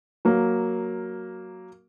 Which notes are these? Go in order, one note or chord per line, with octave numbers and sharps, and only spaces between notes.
F#3 A#3